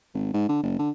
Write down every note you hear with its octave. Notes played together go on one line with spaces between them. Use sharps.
G#1
G#2
D3
F#1
D3